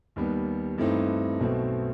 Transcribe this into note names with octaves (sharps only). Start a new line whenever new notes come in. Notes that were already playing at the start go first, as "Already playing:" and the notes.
D#2 D#3 G3 B3
G2 E3 A3 C4 D#4
B1 B2 A3 C4